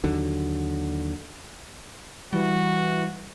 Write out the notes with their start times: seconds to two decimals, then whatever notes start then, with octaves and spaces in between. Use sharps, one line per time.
0.04 D#2 D3 F#3
2.33 E3 G3 F#4